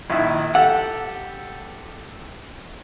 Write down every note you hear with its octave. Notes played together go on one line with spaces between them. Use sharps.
A#1 D#3 E4
G4 A4 F#5